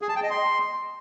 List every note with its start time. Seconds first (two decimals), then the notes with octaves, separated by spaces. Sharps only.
0.02 G#4
0.09 A5
0.16 G5
0.23 D#5
0.30 C6